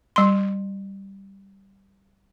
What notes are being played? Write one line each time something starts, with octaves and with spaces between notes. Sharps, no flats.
G3 C6